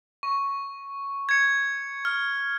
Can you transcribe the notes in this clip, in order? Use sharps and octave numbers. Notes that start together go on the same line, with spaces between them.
C#6
G#6 C#7
F6